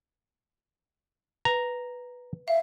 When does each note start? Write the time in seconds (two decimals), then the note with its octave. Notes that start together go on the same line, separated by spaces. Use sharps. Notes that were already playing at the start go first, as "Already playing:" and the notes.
1.45 B4 A#5
2.48 E5 F5